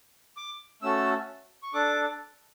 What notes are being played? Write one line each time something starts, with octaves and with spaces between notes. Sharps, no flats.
D6
A3 C#4 F#4 A4 E6
C#6
D4 A4 D6